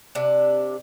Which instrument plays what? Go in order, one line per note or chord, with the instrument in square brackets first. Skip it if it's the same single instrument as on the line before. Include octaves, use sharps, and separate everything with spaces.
[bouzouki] C3 D4